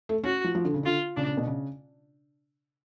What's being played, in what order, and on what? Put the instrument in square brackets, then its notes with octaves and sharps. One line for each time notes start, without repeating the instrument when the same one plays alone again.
[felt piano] A3
[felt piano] C#4 [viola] F#4
[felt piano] F3
F3
D3
C#3
[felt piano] D3 [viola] F4
[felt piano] C#3 [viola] D4
[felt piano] C#3
B2
C#3